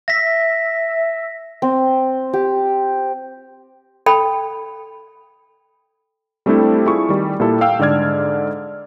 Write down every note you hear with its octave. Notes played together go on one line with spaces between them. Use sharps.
E5 A#6 B6
C4
G4
A4 G5 B5
G3 A3 C4 D4 E4 A4
E4 F4 G#4 C#6
D#3 G3
A#2 G3 E4 A4
F5 G5 E6
G#2 D3 A4 D5 F6 G#6